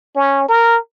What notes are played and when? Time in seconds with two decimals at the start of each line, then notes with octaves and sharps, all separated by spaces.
0.16 C#4
0.49 A#4